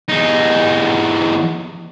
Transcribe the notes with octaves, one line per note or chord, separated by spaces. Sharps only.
E2 D#4